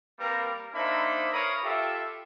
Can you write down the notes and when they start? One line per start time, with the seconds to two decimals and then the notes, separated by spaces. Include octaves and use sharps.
0.20 G3 A#3 C4 A#4 B4 A#5
0.74 A#3 D4 D#4 C5 E5 B5
1.33 A#4 B4 C#5 F5 B5 D#6
1.64 F4 G4 A4 E5